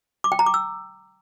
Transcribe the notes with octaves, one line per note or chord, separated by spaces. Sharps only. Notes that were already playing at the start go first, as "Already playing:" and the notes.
D6
G5
A#5
D6
E6